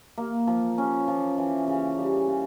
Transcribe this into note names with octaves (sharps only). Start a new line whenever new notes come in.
A#3
F3
C#4
F3
E3
C#3
G3
C#3